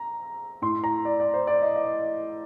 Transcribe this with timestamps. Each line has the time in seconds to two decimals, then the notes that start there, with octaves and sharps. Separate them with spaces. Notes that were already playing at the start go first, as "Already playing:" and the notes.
Already playing: A#5
0.62 A2 C6
0.84 A#5
1.05 D5
1.20 D5
1.34 C5
1.47 D5
1.62 D#5
1.76 D#5